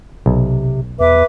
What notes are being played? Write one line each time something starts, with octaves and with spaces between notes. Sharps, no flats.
B1 C3
E2 B4 E5 D6